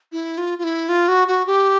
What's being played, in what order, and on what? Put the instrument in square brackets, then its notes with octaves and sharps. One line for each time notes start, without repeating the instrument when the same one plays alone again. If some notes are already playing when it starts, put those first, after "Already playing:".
[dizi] E4
F4
F4
E4
F4
F#4
F#4
G4